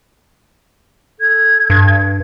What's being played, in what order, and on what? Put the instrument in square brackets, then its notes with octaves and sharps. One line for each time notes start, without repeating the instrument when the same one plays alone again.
[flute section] A4 G#6
[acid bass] G2